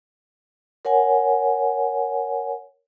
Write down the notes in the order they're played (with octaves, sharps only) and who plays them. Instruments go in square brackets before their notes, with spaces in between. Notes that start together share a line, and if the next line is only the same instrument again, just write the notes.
[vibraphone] A#4 C#5 F#5 G#5